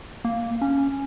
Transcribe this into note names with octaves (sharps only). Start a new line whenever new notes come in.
A#3
C#4